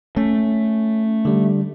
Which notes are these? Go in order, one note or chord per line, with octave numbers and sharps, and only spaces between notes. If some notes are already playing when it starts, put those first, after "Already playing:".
A3 C#4
D3 G3